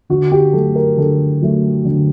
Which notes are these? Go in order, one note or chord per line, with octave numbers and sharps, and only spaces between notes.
D3 F#4
G4
F#3 A3 A4
A#4
D3 A4
F#3 A3
D3